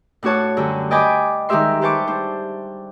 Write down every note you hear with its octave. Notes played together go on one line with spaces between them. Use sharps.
A2 D4 F#4 C#5 A5
F#2 D3 G3
D5 D#5 G5 G#5 B5 D6
D#3 G3 G#3 G4 E5 C6
G4 B4 C5 A5 C#6 D6
D4 C5